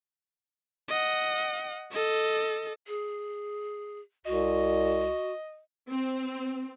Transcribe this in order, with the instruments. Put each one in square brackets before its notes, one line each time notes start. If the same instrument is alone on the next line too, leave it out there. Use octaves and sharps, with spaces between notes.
[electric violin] D#5 F#5
A4 D#5
[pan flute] G#4
[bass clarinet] C2 [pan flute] F#4 [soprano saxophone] D#5
[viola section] C4